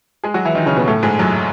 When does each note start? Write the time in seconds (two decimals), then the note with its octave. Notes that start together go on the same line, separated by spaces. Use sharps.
0.24 G#3 G#4
0.34 F#3 F#4
0.45 E3 E4
0.55 D#3 D#4
0.66 C#3 C#4
0.77 B2 B3
0.87 A2 A3
1.03 G#2 G#3
1.19 F#2 F#3